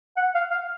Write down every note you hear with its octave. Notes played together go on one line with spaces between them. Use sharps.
F#5
F5
F5